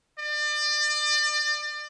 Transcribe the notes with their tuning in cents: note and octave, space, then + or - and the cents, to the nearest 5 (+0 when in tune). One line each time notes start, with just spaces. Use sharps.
D5 +35